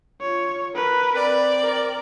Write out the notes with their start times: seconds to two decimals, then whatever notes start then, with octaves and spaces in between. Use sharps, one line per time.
0.21 F4 C#5
0.75 A#4 B4
1.13 C4 D5
1.61 A#4